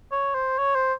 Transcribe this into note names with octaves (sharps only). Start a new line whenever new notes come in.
C#5
C5
C#5
C5